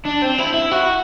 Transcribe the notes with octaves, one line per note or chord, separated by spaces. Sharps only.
D4
C4
E4
E4
F#4